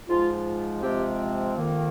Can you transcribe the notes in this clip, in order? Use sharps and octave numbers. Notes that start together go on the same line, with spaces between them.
G#2 F3 G#3 F4
C3 F3 G#3 C4 G4
F2 D#3 A#3